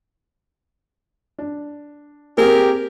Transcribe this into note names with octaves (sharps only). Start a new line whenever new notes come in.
D4
A#3 C4 G4 G#4 A#4